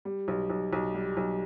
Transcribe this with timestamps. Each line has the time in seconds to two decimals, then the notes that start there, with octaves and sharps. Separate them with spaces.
0.05 G3
0.28 B1
0.50 B1
0.73 B1
0.94 G3
1.17 B1